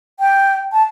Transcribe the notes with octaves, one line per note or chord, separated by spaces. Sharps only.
G5
A5